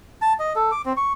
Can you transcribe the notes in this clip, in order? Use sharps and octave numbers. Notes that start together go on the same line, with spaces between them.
A5
D#5
A4
D6
C4
C#6